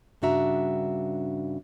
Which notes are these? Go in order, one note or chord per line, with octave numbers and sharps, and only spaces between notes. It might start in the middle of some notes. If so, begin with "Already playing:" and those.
G2 C#3 D4 F#4 E5 A#5